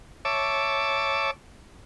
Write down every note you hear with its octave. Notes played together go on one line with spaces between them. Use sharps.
C#5 E5 A5 D6